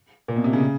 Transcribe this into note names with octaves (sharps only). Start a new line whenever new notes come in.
A#2
B2
C3
C#3